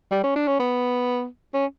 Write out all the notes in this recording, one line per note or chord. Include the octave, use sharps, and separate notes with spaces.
G3
C#4
D4
C#4
B3
C#4